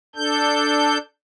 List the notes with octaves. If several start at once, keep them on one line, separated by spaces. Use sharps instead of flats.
D4 A4 G6